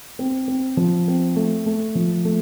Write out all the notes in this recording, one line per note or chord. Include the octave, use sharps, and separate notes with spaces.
C4
C4
F3
C4
A3
A3
F3
A3